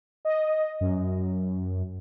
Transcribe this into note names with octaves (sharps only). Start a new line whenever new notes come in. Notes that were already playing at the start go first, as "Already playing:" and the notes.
D#5
F#2